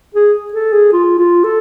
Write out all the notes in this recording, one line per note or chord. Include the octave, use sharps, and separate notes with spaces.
G#4
A4
G#4
F4
F4
A4